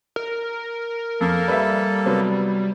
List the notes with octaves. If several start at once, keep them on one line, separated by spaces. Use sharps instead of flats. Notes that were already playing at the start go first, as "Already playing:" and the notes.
A#4
F2 A#3 A4
G3 B4 E5
C3 F#3 B3